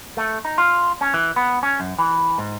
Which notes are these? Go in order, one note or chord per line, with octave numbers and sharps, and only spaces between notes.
A3
D#4
F4
C#4
E3
B3
C#4
F#2
E3
G#2